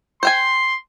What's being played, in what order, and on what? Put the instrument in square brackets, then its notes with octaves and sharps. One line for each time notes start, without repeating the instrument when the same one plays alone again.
[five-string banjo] C5 G5 G#5 [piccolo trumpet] C6